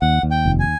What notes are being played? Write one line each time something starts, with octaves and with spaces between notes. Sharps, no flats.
D#2 F#5
D#2
G5
F1
G#5